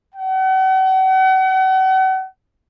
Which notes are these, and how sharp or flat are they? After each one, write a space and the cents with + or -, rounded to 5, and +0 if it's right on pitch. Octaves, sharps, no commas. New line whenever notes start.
F#5 +40